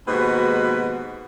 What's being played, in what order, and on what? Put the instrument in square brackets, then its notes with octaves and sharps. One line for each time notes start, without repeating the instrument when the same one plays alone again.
[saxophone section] D#2 G#2 B2 G#3 F#4 B4